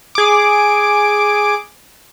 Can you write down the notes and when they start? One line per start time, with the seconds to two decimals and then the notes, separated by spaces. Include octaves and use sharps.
0.15 G#4 D6